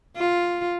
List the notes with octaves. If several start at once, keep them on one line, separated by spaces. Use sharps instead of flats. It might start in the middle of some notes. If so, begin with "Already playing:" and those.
F4